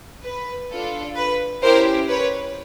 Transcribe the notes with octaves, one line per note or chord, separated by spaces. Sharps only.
B4
D4 F4 A4
B4
C#4 E4 G4 A#4 C5
B4 C#5